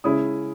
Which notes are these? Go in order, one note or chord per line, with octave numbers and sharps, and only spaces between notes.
C#3 G#3 C#4 E4 D#6